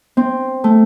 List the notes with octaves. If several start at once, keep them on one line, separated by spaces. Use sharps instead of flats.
C4
A3